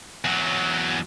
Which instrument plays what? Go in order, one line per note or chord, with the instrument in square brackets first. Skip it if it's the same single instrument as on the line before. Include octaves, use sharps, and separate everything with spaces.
[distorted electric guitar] E2 F#3